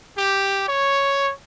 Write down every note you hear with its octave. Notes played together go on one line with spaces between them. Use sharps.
G4
C#5